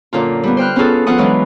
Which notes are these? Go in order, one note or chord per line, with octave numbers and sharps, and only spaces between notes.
F#2 A#2 D3 F4
G3 B3
C5 G5 F6 F#6
B3 C#4 F4 F#4 G#4 A4
F3 B3 F4 F#5 D#6
E3 F#3 G#3 D4 F4